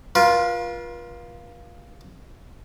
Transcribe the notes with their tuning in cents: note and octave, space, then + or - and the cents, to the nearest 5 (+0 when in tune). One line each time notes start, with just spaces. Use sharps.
F4 +0 B4 -45